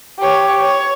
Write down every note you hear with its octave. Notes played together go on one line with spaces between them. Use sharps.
G4 C#5
C#5